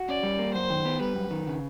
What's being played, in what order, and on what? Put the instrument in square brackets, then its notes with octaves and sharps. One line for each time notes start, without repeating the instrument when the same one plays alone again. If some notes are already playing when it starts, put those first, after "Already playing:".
Already playing: [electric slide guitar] F#4
[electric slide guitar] C#4 [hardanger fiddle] D5
[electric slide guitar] G3
A#3
[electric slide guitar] F#2 [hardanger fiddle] C5
[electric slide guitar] D#3
B3
[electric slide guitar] G3 [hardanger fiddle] B4
[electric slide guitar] F#2
D#3
C#3